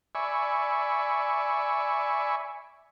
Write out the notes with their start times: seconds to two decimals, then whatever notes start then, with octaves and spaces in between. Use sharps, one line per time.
0.15 D5 E5 G#5 B5 C#6